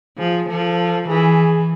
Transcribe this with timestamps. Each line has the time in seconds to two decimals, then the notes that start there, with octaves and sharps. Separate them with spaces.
0.19 F3 G#4
0.49 F3 A4
1.09 E3 G#4